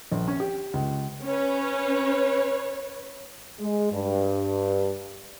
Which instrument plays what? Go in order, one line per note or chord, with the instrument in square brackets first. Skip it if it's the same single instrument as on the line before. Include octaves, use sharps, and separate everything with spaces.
[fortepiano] A#1
C#4
G4
C#2
[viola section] C#4 [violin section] B4 C#5
[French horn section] G#3
G2